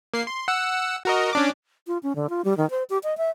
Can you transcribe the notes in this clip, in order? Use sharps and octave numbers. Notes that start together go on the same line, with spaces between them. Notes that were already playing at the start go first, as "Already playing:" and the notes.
A#3 C7
C6
F#5 E6
F#4 A#4 D#5
C#4 D4 D6
F4
C#4
D3
F4
G3
D#3
C5
G4
D#5
E5